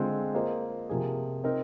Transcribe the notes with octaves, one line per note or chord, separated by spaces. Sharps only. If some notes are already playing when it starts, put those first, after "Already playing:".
Already playing: D3 G#3 C4 F4
A#3 F4 G#4 C5 D#5
C3 F3 A#3 F4 G#4
C4 D#4 A#4